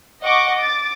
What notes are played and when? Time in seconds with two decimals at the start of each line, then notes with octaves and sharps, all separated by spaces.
0.22 D#5 F#5 C#6 D6
0.55 D6 A6